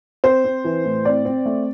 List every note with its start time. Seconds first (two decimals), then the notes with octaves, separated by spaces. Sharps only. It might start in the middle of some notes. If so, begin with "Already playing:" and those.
0.24 C4 C5
0.44 C4
0.64 E3
0.85 A2
1.05 C4 D5
1.25 C4
1.46 A3